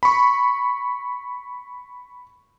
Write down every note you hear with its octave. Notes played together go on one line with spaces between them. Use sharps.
B5 C#6